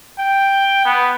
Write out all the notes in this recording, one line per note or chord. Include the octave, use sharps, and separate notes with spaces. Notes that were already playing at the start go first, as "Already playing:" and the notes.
G5
B3